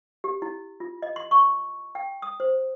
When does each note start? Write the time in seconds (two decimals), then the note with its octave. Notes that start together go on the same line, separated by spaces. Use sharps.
0.24 G4
0.42 E4
0.80 F4
1.02 D#5
1.16 C6
1.31 C#6
1.95 G5
2.22 D#6
2.40 C5